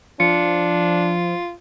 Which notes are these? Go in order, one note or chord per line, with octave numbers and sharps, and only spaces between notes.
F3 D4 F4 C#7